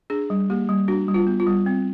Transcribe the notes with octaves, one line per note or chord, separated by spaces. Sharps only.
D4 G#4
G3
A#3 G4
G3
D4 F#4
G3
F4
B3
F4
G3
C4